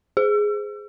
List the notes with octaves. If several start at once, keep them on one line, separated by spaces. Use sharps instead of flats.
G#4